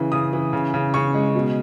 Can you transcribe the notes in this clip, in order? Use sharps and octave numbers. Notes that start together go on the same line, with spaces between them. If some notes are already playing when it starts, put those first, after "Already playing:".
Already playing: C#3 E3
C#3 D#6
E3
C#3
C#3
C#3 C#6
G#3
B2